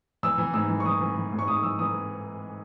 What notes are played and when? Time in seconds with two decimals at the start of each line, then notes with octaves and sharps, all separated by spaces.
0.23 E3 E6
0.38 E3
0.54 G#2 E6
0.69 E3
0.80 C#6
0.85 E3 D#6
1.01 E3
1.17 E3
1.32 G#2
1.39 C#6
1.47 G#2 D#6
1.63 E3 E6
1.79 E3 D#6